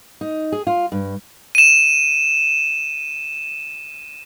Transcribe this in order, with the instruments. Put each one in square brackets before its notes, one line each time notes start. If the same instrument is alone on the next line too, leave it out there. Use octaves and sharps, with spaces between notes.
[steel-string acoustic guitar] D#4
G#4
F4
G2
[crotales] D#7 E7